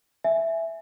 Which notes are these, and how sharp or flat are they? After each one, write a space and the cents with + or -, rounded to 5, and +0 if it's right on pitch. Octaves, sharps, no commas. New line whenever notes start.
E5 +0 G#5 +0